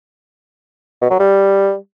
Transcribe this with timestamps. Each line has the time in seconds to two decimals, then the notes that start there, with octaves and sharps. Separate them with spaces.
1.01 B2
1.10 F#3
1.19 G3